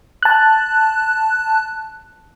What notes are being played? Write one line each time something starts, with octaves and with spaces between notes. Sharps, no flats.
A5 F#6